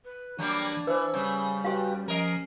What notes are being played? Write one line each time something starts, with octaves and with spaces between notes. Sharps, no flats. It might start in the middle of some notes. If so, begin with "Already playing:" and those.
B4
E3 F#3 G3 A#3 D4
E3 B4 C5 E6
C#3 G3
F#4 G4 B4 F5 G5
F3 C#4 A#4 D#5 C7